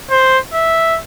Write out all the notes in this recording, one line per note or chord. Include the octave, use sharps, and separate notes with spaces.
C5
E5